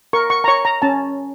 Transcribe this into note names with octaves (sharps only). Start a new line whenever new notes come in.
A#4 C#6
C#6
A#5
C#5 C#6
A#5
C#4 A5